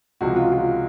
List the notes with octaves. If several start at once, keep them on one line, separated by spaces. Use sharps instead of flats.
C#2 C3 F3 G#3 F#4
F4
F4